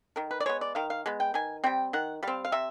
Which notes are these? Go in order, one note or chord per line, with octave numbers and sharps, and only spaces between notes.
D#3 A#4
B4
D5
G#3 B3 C#5
D5
D#3 F5
F5
G#3 B3
G5
D#3 G#5
G3 C4 G5
D#3 F#5
G3 C4 F5
F5
C3 E5